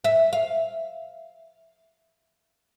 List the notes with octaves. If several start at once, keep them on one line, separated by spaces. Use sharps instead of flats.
E5
F5